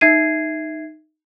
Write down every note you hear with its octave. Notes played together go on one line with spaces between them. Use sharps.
D#4 E5 G#6 C7 D#7